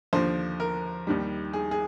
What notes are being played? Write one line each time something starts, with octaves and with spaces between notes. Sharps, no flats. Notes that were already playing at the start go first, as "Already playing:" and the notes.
D#2 D3 F3 C5
A#4
D#2 D#3 G3
G#4
G#4